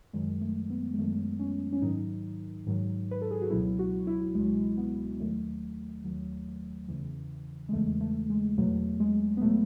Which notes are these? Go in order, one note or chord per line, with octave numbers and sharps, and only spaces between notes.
F#2 D#3 F#3 G#3
A3
B3
G#3
F#2 D#3 F#3 A3
C#4
C#4
G#2 D#3 F#3 D#4
G#2 D#3 F#3
B4
A4
G#4
F#4
C#2 B2 F#3 E4
F#4
E4
C#2 B2 F#3 G#3
B3
D#2 D#3 F#3 A3
D#2 D#3 F#3
E2 C#3 E3
G#3
E2 C#3 E3 A3
A3
G#3
E2 B2 F#3 A3
G#3
B3
B2 F#3 A3